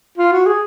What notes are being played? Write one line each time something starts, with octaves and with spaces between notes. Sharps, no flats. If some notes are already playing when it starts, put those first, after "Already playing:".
F4
F#4
G#4